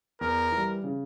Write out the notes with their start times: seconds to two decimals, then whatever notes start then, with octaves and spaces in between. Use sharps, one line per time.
0.21 E2 A#4
0.52 E3
0.57 G3
0.84 C#3